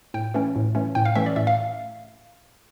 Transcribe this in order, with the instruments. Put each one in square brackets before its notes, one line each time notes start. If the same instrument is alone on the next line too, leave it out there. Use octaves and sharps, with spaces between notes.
[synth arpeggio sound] A2 G5
E3 A3 C#4
A2
E3 A3 C#4
A2 G5
F5
E3 A3 C#4 E5
D5
A2 E5
F5